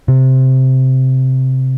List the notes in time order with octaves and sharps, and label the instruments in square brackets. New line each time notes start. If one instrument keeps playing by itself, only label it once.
[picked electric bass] C3